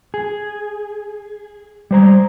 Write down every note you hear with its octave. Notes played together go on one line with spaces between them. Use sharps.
G#4
G3 C5 A#5